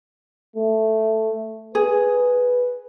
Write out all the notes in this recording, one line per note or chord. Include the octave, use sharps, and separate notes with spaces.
A3
G#4 B4